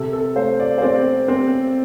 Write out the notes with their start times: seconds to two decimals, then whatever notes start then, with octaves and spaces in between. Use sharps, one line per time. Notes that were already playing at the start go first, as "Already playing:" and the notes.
Already playing: C3 A4
0.13 A4
0.36 A3 C5
0.60 D5
0.78 C5
0.82 C4 D5
1.28 C4